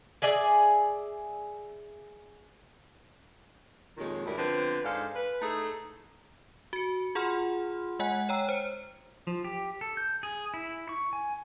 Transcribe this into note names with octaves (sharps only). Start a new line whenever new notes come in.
G#4 D5 E5 G#5
F2 A#2 D#3 G#3 G4 C#5
D2 G2 D4 E4 G#4 A#4
D3 F3 B3 C4 F4 B4
G#2 G#3 D4 A4 C5 F5
B4
A3 D#4 E4 G#4 A4
F#4 C#7
F4 G#4 F#5 B5 C6 F6
G#3 D#5 F#5 G#5 F#6
C#5 G5 A#5 E6
C5 C#7
F3
G4
A4
G6
G#4
E4
C#6
G#5